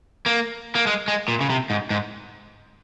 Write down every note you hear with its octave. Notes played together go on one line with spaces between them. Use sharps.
A#3
A#3
G#3
G#3
A#2
C#3
C3
G#2
G#2